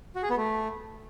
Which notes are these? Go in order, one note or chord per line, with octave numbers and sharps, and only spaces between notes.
F#4
G#4
B3
A3